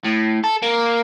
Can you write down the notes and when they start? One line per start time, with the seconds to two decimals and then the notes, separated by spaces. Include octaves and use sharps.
0.05 A2
0.44 A4
0.62 A#3